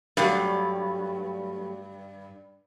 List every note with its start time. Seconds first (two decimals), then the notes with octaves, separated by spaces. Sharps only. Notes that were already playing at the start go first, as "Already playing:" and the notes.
0.17 G2 F#3 G3 A3